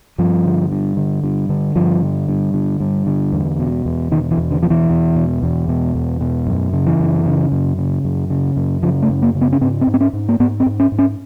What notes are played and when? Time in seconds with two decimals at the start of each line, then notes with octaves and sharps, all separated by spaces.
0.18 G2 F3
0.45 D3
0.72 G2
0.97 D3
1.24 G2
1.49 D3
1.76 G2 F3
2.02 D3
2.28 G2
2.54 D3
2.80 G2
3.07 D3
3.32 E2
3.59 B2
3.85 E2
4.11 B2 D#3
4.31 E3
4.38 E2
4.51 D3
4.63 B2 F3
4.70 E3
4.90 E2
5.16 B2
5.43 E2
5.68 B2
5.95 E2
6.21 B2
6.47 F#2
6.73 C#3
6.87 E3
7.00 F#2
7.26 C#3
7.52 F#2
7.78 C#3
8.04 F#2
8.30 C#3
8.57 F#2
8.83 C#3 F3
9.03 A3
9.09 F#2
9.22 A#3
9.35 C#3
9.41 B3
9.53 C#4
9.61 G#2 C4
9.81 C4
9.87 G#2
9.94 C4
10.01 C#4
10.13 G#2
10.29 A#3
10.40 G#2 B3
10.60 C4
10.66 G#2
10.80 C#4
10.92 G#2
10.99 C#4